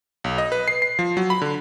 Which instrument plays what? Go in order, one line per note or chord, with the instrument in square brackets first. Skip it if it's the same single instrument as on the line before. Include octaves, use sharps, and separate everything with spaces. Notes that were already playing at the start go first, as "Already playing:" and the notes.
[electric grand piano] B1
D#5
B4
C7
C7
F3
F#3
B5
D3